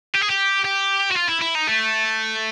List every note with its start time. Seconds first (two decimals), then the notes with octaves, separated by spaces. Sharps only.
0.15 G4
0.22 G#4
0.30 G4
0.65 G4
1.12 F#4
1.17 F4
1.29 E4
1.41 E4
1.55 D#4
1.67 A3